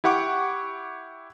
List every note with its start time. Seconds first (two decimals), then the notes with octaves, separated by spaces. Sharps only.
0.04 E4 G4 F#5 C#6 D6